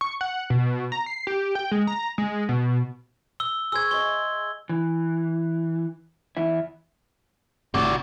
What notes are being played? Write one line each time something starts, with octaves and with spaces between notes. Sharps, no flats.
C#6
F#5
B2
A#5
C7
G4
G5
G#3
A#5
G#3
B2
E6 G7
G#4 C5 C#6 E6 G#6
C5 D#5 E5 G7
E3
E2 E4
G1 A2 C3 F#4 D5